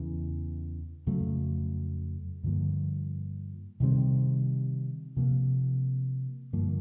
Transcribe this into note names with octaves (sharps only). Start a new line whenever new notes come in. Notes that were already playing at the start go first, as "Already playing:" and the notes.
Already playing: E2 C#3 E3
F2 C#3 F#3 A3
G2 D3 F3 A#3
C3 D#3 G3 C4
C3 F3 A#3
G2 D3 F3 A#3